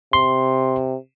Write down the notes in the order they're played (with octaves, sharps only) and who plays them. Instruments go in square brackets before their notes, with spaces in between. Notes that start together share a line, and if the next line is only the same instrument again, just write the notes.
[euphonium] C3 [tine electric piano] C6